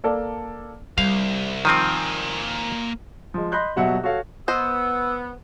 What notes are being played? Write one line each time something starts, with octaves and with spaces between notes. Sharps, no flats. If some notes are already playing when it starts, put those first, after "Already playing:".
A#3 A4 D5
C2 G3 F5
D#3 F3 A#3 C4 G#5
F3 G#3
D#5 B5 C6 F#6 G6
D#1 B2 F#3 E5 F#5
F#4 A4 C#5 F5
B3 C5 D#5 E6